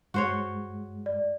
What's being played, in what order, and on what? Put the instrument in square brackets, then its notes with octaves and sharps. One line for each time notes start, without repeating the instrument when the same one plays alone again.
[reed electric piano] G2 G#3 [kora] F#4 C5 C#5
[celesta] D5